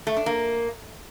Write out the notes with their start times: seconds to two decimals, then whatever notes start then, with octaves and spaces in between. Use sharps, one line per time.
0.07 A3
0.16 D4
0.26 A#3